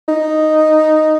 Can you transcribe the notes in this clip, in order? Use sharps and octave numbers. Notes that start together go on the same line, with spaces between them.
D#4